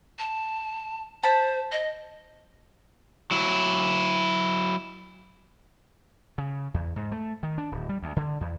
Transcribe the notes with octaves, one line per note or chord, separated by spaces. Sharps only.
A5
C5 A5 B5
D#5
F#3 E4
C#3
E2
G#2
A3
D#3
D4
D1
G3
D2
D3
E2